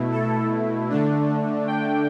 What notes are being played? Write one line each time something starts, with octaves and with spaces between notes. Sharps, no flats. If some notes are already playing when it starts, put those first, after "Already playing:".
Already playing: B2 A3 E4
A4
D3 A3 D4
G5